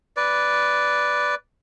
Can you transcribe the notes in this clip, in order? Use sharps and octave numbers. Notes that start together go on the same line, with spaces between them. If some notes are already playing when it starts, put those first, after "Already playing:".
B4 D5